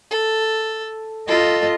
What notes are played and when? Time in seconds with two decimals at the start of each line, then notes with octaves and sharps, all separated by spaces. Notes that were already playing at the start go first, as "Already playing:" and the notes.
0.11 A4
1.28 F4 A4 D#5